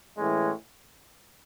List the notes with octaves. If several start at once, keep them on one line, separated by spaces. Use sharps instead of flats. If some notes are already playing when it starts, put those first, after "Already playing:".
A2 E3 G#3 C#4